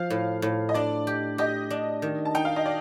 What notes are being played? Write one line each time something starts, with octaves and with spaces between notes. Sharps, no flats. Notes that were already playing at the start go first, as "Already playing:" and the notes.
Already playing: F3 F5
A2
A2
D#5
D4 D5
G4
G4 D#5
D4
D#3
A5
D#4 G5
F5
D#5
D5